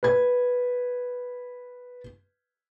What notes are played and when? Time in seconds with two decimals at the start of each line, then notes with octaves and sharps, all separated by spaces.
0.03 B4 G#6